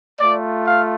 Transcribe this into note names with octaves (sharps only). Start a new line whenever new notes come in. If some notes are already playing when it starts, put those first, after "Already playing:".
A3 F4 D5
F5